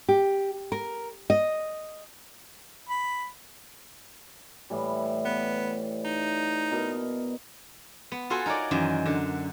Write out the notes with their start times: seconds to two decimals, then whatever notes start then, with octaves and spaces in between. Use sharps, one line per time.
0.09 G4
0.72 A#4
1.30 D#5
2.89 B5
4.70 A2 E3 G3
5.25 B3
6.05 D#4
6.71 B2 A#4 D#5
8.12 B3
8.30 F4 F#4 A4 G#5 C6
8.46 D#4 A#4 C#5 D5
8.71 F#2 D#3 E3 D#5
9.06 D3